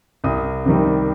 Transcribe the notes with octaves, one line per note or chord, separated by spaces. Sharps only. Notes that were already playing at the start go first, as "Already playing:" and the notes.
C2 D#6
C3 D#3 G3